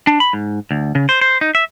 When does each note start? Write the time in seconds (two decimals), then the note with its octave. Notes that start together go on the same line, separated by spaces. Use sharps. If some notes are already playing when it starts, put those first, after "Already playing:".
0.07 D4
0.20 B5
0.33 G#2
0.71 D2
0.95 C#3
1.09 C5
1.21 C5
1.41 D#4
1.55 E5